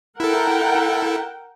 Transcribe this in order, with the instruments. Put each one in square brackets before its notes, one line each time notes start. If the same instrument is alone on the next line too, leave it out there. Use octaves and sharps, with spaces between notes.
[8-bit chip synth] E4 A4 [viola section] A#4 F#5 G5